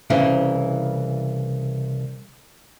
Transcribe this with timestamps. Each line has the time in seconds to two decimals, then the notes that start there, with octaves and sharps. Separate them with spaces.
0.10 C2 C#3 E3